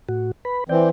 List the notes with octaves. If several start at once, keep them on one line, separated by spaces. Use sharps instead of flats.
A2 F#4
B4 B5
E3 C4 D5 G5